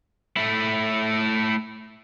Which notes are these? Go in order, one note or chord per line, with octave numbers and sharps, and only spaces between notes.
A3 E4